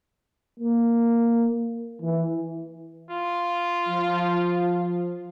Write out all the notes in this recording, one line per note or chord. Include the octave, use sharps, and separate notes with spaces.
A#3
E3
F4
F3